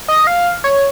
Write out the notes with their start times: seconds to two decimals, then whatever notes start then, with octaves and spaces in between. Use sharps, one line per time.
0.08 D#5
0.27 F5
0.64 C#5